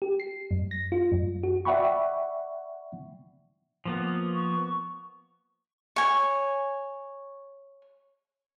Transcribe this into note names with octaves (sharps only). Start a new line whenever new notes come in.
G4
C7
F#2
A#6
F4
F#2
F#4
D5 E5 F#5 G5 B5 C#6
F3 A#3 B3
C#6
C#5 G#5